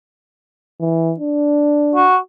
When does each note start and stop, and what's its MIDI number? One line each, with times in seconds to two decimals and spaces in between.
0.80 1.14 52
1.19 2.06 62
1.95 2.17 66